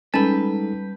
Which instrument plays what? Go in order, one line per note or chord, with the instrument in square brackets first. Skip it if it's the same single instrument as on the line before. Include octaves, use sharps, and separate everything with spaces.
[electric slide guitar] G3 B4 [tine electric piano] G#3 D#4 A4 [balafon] C#4 [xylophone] A5 B5